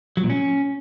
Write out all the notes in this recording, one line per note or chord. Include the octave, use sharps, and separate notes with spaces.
F#3
A#2
C#4